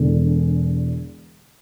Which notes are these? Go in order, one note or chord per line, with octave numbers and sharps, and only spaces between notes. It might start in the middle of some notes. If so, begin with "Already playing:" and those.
Already playing: E1 E2 D3